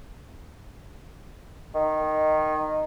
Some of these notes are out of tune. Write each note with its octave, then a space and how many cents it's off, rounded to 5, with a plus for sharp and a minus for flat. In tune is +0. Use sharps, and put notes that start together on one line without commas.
D#3 -10